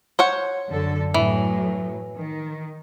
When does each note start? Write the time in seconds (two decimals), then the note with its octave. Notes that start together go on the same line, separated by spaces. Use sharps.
0.19 C5 C#5 F#5
0.69 F#2 D3 A4
1.14 A2 E3 F#3
2.17 D#3